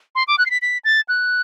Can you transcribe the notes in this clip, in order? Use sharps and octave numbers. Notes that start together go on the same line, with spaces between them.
C6
D6
F#6
C7
B6
B6
A6
F#6